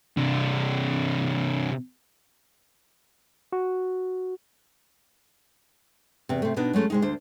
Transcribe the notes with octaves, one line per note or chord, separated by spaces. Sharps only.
C3 D4
F#4
E2 C3
C3 A3
B2 B3 D4 D#4
F#3 G#3 A3 C#4
C3 G#3 D#4
D2 D4 C5